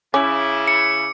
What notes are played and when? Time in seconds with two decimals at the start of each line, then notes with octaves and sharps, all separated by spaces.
0.14 C#3 C#4 E4 D6
0.68 C#7